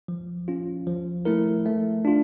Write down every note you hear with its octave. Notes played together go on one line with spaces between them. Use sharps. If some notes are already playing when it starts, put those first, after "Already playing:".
F3
C#4 F4
F3
A3 E4 A#4
A3
D4 F4